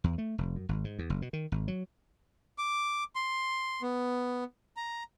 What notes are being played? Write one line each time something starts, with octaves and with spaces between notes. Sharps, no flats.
E2
A3
F1
F#2
G#1
G#2
E2
F#1
B2
D#3
G#1
F#3
D6
C6
B3
A#5